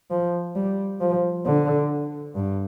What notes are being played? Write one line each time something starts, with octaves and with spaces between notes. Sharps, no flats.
F3
G3
F3
D3
G2